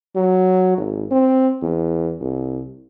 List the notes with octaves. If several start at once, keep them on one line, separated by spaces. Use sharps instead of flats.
F#3
G#1
C4
E2
C2